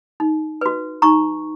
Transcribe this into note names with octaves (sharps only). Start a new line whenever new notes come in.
D#4
F#4 B4
D#4 A#5 C#6